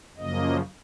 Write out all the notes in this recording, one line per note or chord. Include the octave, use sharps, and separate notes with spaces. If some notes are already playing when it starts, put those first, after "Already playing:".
F#2 C#3 F3 A#3 D#5